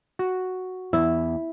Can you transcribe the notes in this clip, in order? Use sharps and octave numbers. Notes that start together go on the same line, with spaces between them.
F#4
E2 E4